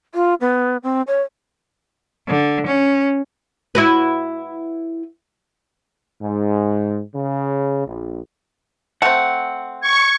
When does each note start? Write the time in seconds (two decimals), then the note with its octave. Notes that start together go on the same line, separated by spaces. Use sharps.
0.15 F4
0.41 B3
0.83 C4
1.07 C#5
2.28 D3
2.67 C#4
3.75 E4 F#4 B4
6.21 G#2
7.15 C#3
7.86 A#1
9.02 A3 C4 F#5
9.82 C#6 G#6